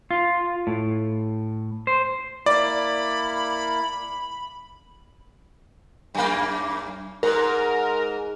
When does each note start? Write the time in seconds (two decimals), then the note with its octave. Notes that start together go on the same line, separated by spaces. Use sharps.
0.11 F4
0.67 A2
1.87 C5
2.46 A#3 E4 D5 B5
6.15 F#2 A#3
7.23 G#2 A#4